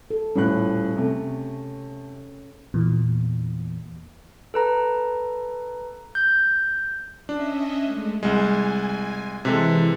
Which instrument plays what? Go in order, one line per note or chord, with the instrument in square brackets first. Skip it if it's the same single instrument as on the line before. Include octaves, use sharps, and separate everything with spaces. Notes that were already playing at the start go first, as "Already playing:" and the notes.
[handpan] A4
[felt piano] D#1 A2 F#6 [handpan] C#4
[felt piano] C3 A3
[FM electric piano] E2 A#2
[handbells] A4 B4 A#5
G6
[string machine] C#4 D#5 E5 [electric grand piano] D4
[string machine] G#3 A3
[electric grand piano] C2 G#3 [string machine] G#5
[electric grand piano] C3 G#3 A4 [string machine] E3